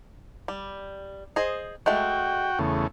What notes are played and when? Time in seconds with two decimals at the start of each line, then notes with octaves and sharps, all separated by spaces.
0.48 G3
1.36 G#4 C5 D#5
1.86 G#3 A3 F#4 G5
2.59 E2 C#3 A3